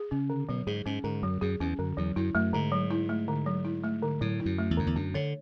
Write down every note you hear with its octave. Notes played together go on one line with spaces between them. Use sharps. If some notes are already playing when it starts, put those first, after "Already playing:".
Already playing: G#4
C#3 C#4
D3
B2 F#3
G#2 G#4
G#2 C#4
G#2 D3
F#2 F#3
F#2 G#4
E2 C#4
F#2 D3
E2 F#3
F#2 E4
F#2 A3
G#2 D3
F#3
E4
A3
D3
F#3
E4
A3
D3
A2 F#3
E4
F#2
A3
E2
F#2 D3
E2
F#2 D4
D3 C#5